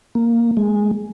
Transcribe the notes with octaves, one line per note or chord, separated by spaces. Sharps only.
A#3
G#3